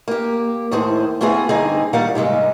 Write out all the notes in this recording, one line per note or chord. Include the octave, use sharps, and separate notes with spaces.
A#3 G4
D#2 A2 G#4 C5
A3 B3 C4 F4 G#4
G2 D3 C4 D#4 G#4 G#5
A#2 D#3 G3 F5 F#5
G#2 C3 G3 G#3